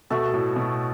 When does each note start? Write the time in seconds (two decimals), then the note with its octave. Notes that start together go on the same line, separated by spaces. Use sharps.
0.10 B2 A3 F#4 A4
0.34 A2
0.56 B2